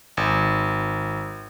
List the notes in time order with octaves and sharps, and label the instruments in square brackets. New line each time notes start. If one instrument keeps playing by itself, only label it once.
[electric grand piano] G#1